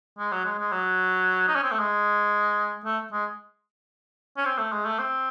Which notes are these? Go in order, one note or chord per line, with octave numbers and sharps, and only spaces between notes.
G#3
F#3
G#3
G#3
F#3
D#4
C#4
C4
A3
G#3
A3
G#3
C#4
C4
A3
G#3
A3
C4